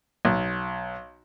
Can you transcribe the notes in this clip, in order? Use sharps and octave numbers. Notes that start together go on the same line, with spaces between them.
B1